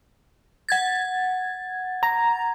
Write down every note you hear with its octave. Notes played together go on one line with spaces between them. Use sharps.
F#5 G#6 A6
A#5